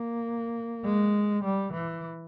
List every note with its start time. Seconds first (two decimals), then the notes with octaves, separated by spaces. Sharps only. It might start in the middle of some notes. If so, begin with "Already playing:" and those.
Already playing: A#3
0.84 G#3
1.44 G3
1.73 E3